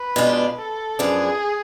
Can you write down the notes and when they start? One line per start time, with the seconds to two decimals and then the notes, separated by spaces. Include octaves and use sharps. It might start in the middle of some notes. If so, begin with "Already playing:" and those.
Already playing: B4
0.16 B2 G#3 D4 F4
0.58 A4
0.99 F#2 F3 B3 D4 G#4